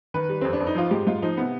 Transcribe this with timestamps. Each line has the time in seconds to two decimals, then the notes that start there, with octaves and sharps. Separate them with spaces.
0.14 D#3 B4
0.29 G3
0.41 F2 C4
0.53 D4
0.60 F2
0.67 D#4
0.75 F3 F4
0.91 G#2 G4
1.07 G#2 F4
1.22 F3 D#4
1.37 C3 B3